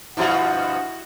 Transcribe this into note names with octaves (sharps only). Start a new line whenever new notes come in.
G2 B2 F3 E4 F#4 F#5